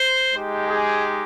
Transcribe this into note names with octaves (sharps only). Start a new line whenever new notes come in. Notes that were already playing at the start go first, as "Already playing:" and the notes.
Already playing: C5
G#3 D#4 G4
G#4